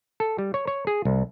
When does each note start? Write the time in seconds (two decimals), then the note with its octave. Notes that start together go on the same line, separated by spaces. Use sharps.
0.20 A4
0.38 G3
0.54 C#5
0.67 C#5
0.87 G#4
1.05 C2